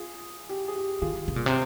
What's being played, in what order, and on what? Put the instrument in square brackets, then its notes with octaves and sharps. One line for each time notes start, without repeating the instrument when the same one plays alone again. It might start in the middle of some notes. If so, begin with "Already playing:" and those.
Already playing: [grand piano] F4 G#4
G4
G#4
G4
[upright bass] D#3 [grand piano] F4 G#4
[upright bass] C3
A#2
C3